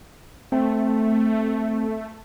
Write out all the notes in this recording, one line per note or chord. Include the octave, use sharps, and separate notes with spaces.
A3 C4